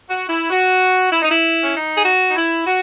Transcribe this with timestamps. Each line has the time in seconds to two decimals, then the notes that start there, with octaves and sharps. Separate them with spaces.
0.08 F#4
0.29 E4
0.50 F#4
1.12 E4
1.22 D#4
1.31 E4
1.64 C#4
1.74 D#4
1.96 G#4
2.05 F#4
2.29 D#4
2.36 E4
2.66 F#4